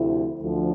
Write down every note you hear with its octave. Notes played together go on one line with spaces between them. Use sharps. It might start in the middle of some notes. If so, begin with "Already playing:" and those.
Already playing: D2 C3 F3 A3 E4
D2 D3 F3